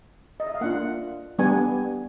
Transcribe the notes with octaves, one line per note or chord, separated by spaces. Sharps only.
D#5
E5
F5
A#3 D4 F4 F#5
G3 B3 D4 G#5